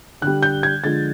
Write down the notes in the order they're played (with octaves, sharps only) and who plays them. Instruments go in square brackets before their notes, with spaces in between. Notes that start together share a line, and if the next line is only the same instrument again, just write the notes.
[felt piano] D3 F#6
G3
G6
G#6
D3 F3 G#3 A6